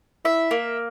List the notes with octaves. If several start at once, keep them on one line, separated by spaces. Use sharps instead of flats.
E4 E5
A#3